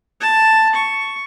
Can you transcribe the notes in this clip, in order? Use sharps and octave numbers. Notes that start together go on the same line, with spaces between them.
A5
C#6